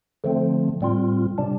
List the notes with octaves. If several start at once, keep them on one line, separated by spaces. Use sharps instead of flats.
D3 F3 A3 C4
A2 G3 C4 F4
C3 G3 D4